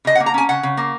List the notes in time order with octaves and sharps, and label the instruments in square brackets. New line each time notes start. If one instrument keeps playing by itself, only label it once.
[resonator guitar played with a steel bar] C#3 D#5
F#5
A#3
A#5
C#4 G#5
C#3 F#5
C#3
A#3